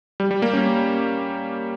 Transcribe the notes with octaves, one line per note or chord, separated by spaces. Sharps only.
G3
G3
A#3
C#4